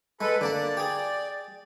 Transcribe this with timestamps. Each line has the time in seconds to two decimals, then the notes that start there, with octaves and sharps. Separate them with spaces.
0.21 G#3 A4 B4
0.41 D3 A#3 D5 A5
0.77 G4 G#4